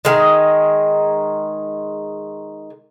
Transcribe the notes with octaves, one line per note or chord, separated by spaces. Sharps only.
D#3 G#3